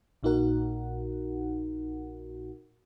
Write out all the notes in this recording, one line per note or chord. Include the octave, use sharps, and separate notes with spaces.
A#1 A#2 D#4 F#4 A#4 F#5